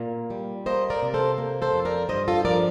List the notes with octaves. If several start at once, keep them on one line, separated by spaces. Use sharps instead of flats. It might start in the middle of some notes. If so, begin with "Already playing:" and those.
Already playing: A#2 A#3
G3
A#3 C5 D#5
A#4 D5
C3
A4 C5
A#3
A4 C5
F2
A#4 D5
G2 C5 D#5
F4 A4
F3 A#4 D5